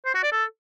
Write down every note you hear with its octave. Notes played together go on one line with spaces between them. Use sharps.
C5
F#4
D5
A4